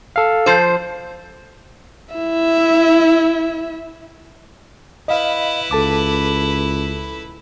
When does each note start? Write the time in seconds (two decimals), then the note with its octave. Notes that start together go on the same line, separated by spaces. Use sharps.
0.16 A4 F5
0.46 F3 C5
2.15 E4 E5
5.08 E4 B4 D#5 F5
5.71 C#2 A4 A5 D6